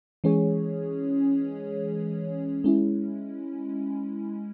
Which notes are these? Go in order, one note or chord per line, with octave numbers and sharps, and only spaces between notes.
E3 G#3 C#4 G#4 C#5
G#3 C#4 E4